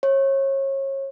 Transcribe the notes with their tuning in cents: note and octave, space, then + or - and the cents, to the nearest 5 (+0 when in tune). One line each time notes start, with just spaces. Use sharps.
C#5 -30